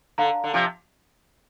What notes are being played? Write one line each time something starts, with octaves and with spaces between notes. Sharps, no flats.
D3 F5 A#5
D3
C3 F3